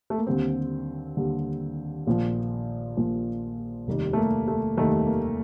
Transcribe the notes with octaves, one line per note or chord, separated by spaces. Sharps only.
A3
A#3
D#2 D3 G3 C4
D#2 D3 G3
A#1 A#2 F3
A#1 A#2 F3
F1 D#2 D#3 G3
A3
A#3
A3
F1 D#2 D#3 G3 A3
A#3